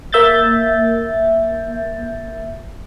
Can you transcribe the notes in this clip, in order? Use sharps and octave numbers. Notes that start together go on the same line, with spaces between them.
A#3 E5 G6 A6